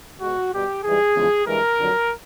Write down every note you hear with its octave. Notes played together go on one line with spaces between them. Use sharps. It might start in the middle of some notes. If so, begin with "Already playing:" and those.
B2 G#3 F#4
B2 G3 G4
G#2 E3 G3 G#4
E2 C#3 F3 G#3
G2 E3 G#3 A#4
F2 D3 F#3